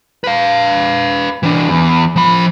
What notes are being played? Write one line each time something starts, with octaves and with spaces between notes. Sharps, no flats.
B4 F5
E3 D4
E2
F3 B5